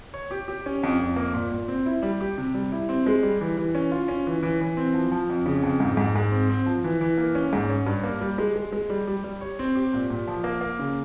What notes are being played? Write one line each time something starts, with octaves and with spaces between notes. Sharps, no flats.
C#5
G4
G4
C#4
F2
F2
A#3
A#2
A#2
C4
E4
G3
G4
C3
G3
E4
C4
G#3
G3
E3
E3
C#4
F4
C#4
E3
E3
E3
C4
F3
F3
F2
C#3
F2
G#2
G#2
G#2
C4
C4
F3
E3
E3
A#3
C#4
G#2
C#4
G2
A#3
G3
G#3
G#3
G#3
G3
G3
G3
C#5
C4
G4
A#2
A#2
F3
A#3
A#3
C#3